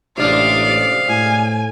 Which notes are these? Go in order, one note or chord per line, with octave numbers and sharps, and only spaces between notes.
A1 C3 G#3 D4 D5 F5
A2 G#5